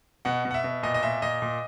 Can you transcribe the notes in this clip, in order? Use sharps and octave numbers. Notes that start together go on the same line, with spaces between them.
B2 F#5
B2
F#5
E5
B2
A#2 D#5
D#5
A#2 E5
A#2 D#5
A#2